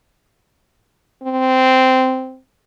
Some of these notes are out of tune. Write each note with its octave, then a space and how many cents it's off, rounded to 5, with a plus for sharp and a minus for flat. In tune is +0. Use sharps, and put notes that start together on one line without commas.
C4 -10